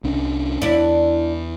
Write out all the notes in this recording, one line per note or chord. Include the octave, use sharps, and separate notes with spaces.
C2 C#4 D4
E2 D4 E4